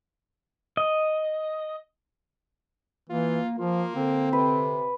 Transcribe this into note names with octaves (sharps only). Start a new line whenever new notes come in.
D#5
E3 A#3 F4
F3 A#3 F4
D3 C4
C3 B4